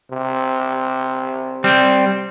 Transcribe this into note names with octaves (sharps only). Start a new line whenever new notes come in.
C3
G3 C4